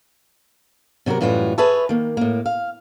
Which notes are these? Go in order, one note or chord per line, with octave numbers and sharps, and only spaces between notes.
C3 F#3 F#4 G4 A#4
F#2 A2 E3 G3 F4 F#4
G#4 B4 C#5 E5 A5
D#3 A#3
A2 A#3
F5